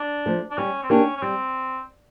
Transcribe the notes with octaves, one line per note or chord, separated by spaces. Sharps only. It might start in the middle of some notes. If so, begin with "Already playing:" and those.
Already playing: D4
F3 A3
D4
G3 C#4
C4
A#3 C#4 D4 G4
C#4
G3 C4